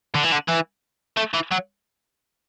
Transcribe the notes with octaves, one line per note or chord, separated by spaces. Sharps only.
D3
E3
D3
E3
A3
E3
F#3